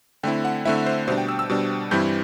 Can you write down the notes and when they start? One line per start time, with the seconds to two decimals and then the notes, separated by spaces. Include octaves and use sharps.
0.23 D3 A3 C4 E4 G5
0.45 F#5
0.65 D3 A3 C4 E4 E5
0.86 C5
1.08 B2 G3 D4 C5
1.18 G5
1.29 E6
1.39 E6
1.50 B2 G3 D4
1.91 G2 E3 G3 C4 E4 G6